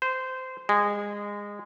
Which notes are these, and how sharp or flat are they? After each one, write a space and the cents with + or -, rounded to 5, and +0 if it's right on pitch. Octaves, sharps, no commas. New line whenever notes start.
C5 -15
G#3 -20